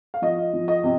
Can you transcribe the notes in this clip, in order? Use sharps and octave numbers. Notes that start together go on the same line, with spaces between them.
F5
F3 D#5
F3
D#5
C3